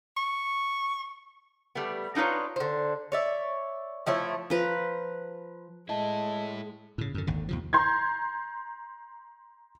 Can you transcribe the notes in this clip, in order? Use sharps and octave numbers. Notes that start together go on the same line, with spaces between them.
C#6
G3 A3 B3
D4 D#4 F4 B4 C#5
D3 C5
C#5 D5 E5
F3 A3 E4 C#5
F3 B4 A#5
G#3 A3 E4 D#5 A5
A2 C#3
F#2 D3
G#1 D#2 D3
D#2 C3 F3
A#5 C6 G6 G#6